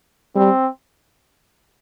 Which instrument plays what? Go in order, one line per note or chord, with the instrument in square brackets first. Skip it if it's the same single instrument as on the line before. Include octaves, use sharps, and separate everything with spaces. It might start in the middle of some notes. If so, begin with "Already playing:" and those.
[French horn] G3 [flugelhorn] C4